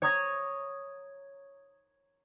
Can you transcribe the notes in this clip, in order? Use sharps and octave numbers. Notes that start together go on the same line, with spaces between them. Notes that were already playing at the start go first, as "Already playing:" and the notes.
C#5 A#5 C#6 D#6 G#6 A#6